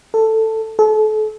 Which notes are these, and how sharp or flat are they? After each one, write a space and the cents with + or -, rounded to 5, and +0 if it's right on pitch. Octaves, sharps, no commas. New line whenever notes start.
A4 +10
A4 -35